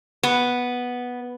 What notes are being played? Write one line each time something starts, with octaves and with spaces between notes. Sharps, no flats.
B3